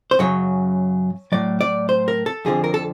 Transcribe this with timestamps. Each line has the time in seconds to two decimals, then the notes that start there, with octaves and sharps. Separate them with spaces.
0.11 C5
0.19 F#2 C#3 F#3 C#5
1.32 A2 F#3 D5
1.61 D5
1.89 C5
2.08 A#4
2.26 A4
2.45 F2 D3 F3 G#4
2.64 A#4
2.74 A4